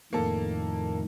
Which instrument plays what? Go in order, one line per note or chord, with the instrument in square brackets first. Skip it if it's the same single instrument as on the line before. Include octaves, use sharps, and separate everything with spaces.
[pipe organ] F2 A2 D#3 [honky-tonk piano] A#3 A4